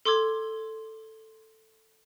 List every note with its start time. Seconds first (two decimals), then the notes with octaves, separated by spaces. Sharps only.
0.05 A4 C6 D6 E6 G#6